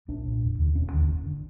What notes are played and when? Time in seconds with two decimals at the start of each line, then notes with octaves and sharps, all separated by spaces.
0.08 A#1 D4
0.25 A#2
0.42 E1
0.59 D#2 D3
0.75 E1 C#4
0.92 D#2 D3
1.09 F#1
1.26 D3